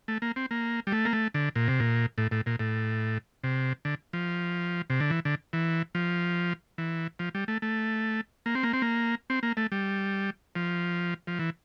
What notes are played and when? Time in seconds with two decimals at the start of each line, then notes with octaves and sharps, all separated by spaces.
0.08 A3
0.22 A#3
0.36 C4
0.51 A#3
0.87 G3
0.92 A3
1.05 A#3
1.13 A3
1.34 D3
1.56 A#2
1.68 C3
1.80 A#2
2.18 A2
2.31 A2
2.46 A#2
2.59 A2
3.44 C3
3.85 D3
4.13 F3
4.90 C3
5.01 D3
5.10 E3
5.25 D3
5.53 E3
5.95 F3
6.78 E3
7.19 F3
7.35 G3
7.48 A3
7.62 A3
8.46 A#3
8.55 C4
8.63 A#3
8.73 C4
8.82 A#3
9.30 C4
9.43 A#3
9.57 A3
9.72 G3
10.55 F3
11.27 F3
11.39 E3